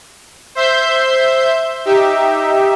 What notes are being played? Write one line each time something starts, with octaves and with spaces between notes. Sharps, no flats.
C5 E5 C6 G6
D#4 G4 E5